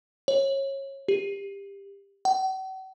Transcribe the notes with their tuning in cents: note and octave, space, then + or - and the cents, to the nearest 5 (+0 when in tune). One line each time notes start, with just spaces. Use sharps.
C#5 -20
G4 +20
F#5 +45